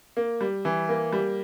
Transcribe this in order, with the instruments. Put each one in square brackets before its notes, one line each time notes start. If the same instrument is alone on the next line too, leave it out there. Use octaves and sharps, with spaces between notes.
[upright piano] A#3
G3
E3
A#3
G3